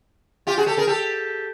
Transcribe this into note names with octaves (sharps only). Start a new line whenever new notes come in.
F4 G4
F#4 G#4
G4 A4
G#4 A#4
G4 A4